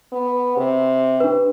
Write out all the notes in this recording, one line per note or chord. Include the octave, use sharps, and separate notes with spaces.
B3
C3
D4 B4